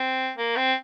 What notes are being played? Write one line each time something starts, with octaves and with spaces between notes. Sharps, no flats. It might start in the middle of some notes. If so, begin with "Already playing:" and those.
Already playing: C4
A#3
C4